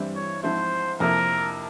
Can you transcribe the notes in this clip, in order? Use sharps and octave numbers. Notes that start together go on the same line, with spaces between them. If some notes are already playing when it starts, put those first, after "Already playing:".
Already playing: G2 E3 G3 C4 E4
C#5
G#2 F3 C4 E4 C5
F2 C3 F3 A#3 E4 A#4